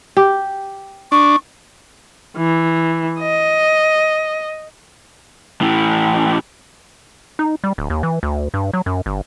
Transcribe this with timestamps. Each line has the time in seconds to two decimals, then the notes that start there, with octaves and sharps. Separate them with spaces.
0.17 G4
1.12 D4 C#6
2.37 E3
3.19 D#5
5.61 A2 E3
7.39 D#4
7.64 G3
7.78 D1
7.90 D#2
8.03 E3
8.23 D2
8.54 G2
8.73 F#3
8.86 F#2
9.06 G1